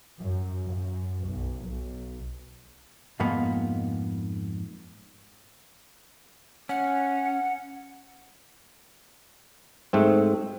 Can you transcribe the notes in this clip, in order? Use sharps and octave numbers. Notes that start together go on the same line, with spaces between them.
F#2
F#2
B1
B1
F2 G#2 A#3 B3
C#4 F#5
G#2 A3 C4